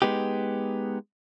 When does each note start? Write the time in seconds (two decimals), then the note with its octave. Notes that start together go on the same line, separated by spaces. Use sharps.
0.02 G#3 B3 D#4 G4